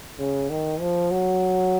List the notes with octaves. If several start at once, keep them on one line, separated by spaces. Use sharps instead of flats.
C#3
D#3
F3
F#3